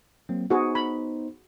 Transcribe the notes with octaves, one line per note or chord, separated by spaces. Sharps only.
F#3 A#3 C4
B3 D#4 F#4 G#4 C5
B5